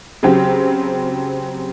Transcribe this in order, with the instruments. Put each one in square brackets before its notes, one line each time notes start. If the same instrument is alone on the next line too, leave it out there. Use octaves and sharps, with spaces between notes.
[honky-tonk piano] C#3 F#3 C4 G4